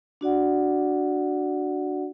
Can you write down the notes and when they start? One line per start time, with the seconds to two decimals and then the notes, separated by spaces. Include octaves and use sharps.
0.21 D4 F#4 D5 F#5